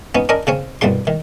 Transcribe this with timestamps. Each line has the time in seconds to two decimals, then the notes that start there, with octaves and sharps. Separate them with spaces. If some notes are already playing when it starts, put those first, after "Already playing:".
0.15 B3 C#4 D#4
0.29 C#4 D4 A#4 D#5
0.47 C#3 C4 C#4
0.81 C2 G2 B2 G3 C6
1.07 D#3